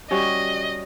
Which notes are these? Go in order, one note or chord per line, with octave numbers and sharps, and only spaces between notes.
G3 C#4 F#4 D#5